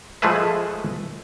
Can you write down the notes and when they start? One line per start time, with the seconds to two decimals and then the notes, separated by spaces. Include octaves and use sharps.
0.22 F3 G#3 A3 G#4 B4 E5